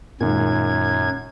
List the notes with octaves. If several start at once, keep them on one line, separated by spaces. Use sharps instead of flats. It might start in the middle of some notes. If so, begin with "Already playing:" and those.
F#2 A#2 D#3 G#3 G#6